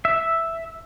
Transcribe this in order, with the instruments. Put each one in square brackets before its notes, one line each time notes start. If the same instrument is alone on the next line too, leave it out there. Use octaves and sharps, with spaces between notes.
[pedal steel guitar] E5